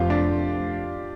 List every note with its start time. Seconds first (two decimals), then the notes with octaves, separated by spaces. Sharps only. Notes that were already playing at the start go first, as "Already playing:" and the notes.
Already playing: F1 F2 F3 A3 C4 F4 G4
0.10 D4